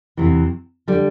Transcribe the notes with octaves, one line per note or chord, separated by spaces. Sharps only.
E2 C3 E3
D3 G3